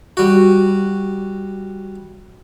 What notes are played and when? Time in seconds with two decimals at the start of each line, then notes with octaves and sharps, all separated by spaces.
0.17 G3 F#4